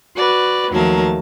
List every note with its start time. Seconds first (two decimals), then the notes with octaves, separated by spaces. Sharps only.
0.16 F#4 B4 D5
0.70 D#2 F3 F#3 A3 A#4 A5